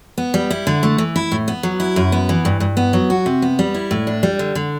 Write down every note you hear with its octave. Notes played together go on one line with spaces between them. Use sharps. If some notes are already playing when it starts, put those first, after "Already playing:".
B3
G3
E4
D3
A3
E3
E4
A2
B3
F#3
E4
F#2
B3
E3
G2
G2
B3
F#3
F#4
C3
B3
G3
E4
A2
D4
G3
D3
D3